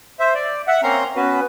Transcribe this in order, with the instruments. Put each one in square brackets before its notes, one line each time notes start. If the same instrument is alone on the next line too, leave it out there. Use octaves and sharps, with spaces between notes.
[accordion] C5 E5
D5
E5 F#5
A#3 C4 C#4 A#5 C6
B3 C#4 F#4 B4